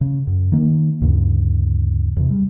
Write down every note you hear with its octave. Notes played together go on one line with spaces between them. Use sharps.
C#3
F#2
D#3 A#3
D2 G2 C#3
E2 C3
G3